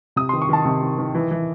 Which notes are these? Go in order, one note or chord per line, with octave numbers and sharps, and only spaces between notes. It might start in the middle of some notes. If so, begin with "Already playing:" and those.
C3 D#6
C6
D#3
C#6
D#3 A5
C3
D#3
D#3
E3
E3